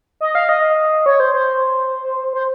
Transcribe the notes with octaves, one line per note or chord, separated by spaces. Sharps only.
D#5
F5
D#5
C#5
C5
C5
C5